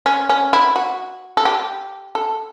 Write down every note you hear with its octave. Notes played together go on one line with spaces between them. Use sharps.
C#4
C#4
E4
F#4
A4
G4
A4